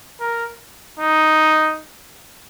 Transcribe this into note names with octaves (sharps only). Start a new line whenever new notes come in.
A#4
D#4